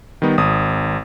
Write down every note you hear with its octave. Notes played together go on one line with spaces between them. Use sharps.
D#3 G3 B3 D#4
G#1 D#6